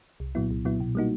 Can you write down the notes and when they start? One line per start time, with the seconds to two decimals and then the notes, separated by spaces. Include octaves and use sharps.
0.20 C2
0.35 A#2 F#3 B3 E4
0.51 C2
0.65 A#2 F#3 B3 E4
0.80 B2
0.95 G3 A#3 D#4 F#4